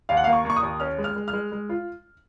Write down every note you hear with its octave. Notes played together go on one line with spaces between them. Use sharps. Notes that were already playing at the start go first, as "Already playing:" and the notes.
D#2 F5
F#5
F5
A#3
C#6
A#3 C#6
D#6
D#2
C#4 F6
G#3
F6
G#3
F6
G#3
G#3
F4